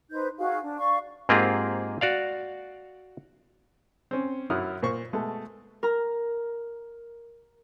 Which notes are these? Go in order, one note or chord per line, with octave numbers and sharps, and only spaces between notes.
D#4 B4 C5 G6
D#4 F#4 G#4 F5
D4
D5 F5 C#6
G#2 A#3 C4 F4 G4 G#4
F#4 D5 F5
C4 C#4
F#2 F#3 E4 D#6 F6
A#2 C5 C#6
B2 G#3 A3
A#4 A#5